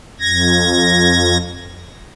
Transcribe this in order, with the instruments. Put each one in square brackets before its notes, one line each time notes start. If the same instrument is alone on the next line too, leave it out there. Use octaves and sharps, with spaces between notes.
[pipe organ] F2 G#6 A#6